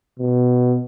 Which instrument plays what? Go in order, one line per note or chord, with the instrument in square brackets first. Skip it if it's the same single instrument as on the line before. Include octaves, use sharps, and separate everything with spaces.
[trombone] B2